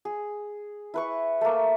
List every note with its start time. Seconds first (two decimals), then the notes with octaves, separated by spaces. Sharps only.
0.05 G#4
0.94 E4 B4 C#6
1.41 A3 A#3